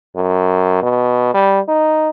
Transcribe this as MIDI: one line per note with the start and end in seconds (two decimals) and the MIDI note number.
0.15 0.78 42
0.82 1.29 47
1.34 1.60 55
1.68 2.10 63